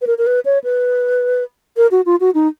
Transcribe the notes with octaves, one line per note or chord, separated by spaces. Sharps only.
B4
A#4
A#4
B4
C#5
B4
A#4
F#4
F4
F#4
D#4